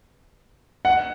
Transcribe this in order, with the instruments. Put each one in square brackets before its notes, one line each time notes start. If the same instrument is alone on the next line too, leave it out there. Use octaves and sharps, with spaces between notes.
[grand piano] F#5